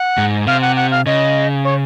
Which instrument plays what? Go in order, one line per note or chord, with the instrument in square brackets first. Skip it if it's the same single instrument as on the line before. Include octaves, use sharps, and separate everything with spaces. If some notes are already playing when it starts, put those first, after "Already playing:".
Already playing: [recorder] F#5
[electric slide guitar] G#2
[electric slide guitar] C3 [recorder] F5
[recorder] F#5
F#5
F5
[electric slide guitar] C#3 [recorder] D#5
[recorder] C#5